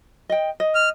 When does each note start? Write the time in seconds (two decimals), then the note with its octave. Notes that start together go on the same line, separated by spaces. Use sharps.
0.29 D#5 G5
0.60 D#5
0.75 F6